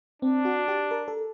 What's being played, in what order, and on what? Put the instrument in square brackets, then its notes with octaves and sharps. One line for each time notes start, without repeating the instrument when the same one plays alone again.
[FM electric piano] C4 [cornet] D4
[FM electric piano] F#4
G4
A#4
A4